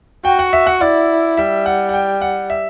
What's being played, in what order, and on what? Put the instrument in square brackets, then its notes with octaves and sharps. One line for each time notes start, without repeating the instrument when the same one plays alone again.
[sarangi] F#4 [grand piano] G5
[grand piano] F#5
E5
F#5
[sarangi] E4 [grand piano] D5
[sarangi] G3 [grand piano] E5
[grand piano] F#5
F#5
G5
F#5
E5